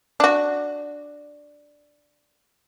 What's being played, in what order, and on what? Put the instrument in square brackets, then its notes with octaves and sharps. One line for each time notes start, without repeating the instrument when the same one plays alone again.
[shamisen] D4 F#4